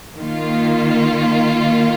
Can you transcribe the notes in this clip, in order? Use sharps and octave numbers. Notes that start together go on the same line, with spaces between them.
D#3 A#3 F4